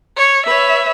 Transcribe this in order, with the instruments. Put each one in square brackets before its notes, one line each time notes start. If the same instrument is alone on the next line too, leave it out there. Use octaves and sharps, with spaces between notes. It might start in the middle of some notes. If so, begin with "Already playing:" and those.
[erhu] C#5
[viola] B4 C#5 [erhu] E5